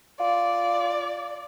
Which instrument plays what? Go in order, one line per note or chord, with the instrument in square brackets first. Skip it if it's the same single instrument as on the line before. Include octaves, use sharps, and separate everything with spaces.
[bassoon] F4 [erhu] D5